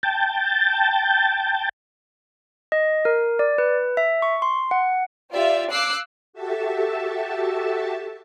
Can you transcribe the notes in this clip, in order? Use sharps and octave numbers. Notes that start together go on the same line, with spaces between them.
G5 A5
D#5
A#4
D5
B4
E5
C#6
C6
F#5
F4 G4 D5 E5
F5 D6 E6 F#6 C7
F#4 G4 A4 E5 A5